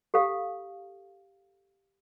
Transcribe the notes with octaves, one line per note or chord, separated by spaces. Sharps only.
G4 A4 F5